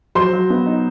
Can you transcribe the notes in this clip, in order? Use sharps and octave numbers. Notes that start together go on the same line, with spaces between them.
F#3 C5 C6
F#3
B3
D#4